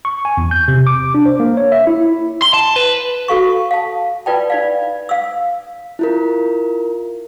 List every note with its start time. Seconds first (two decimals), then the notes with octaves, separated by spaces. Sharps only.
0.05 C#6
0.25 G#5
0.37 E2
0.51 G6
0.68 C3
0.87 D6
1.14 D4
1.26 C5
1.40 A#3
1.57 C#5
1.72 E5
1.87 E4
2.42 C6
2.54 A5
2.76 B4
3.28 F#4 A4 F5 C#6
3.71 F5 A5
4.26 F4 B4 D5 G5 A5
4.50 D#4 D5 F5
5.09 F5 E6
5.99 E4 F4 A#4